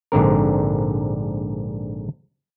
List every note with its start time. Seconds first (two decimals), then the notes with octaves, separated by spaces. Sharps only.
0.12 A#1 G#2 D3 C4 A#4